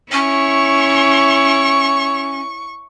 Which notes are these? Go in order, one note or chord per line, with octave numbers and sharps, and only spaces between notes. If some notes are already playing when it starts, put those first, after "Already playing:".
C#4 E4 C#5 C#6